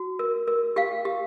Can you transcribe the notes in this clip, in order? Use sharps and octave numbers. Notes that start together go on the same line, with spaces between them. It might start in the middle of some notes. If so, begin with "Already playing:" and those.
Already playing: F#4
A#4
A#4
G4 F5 G5
G4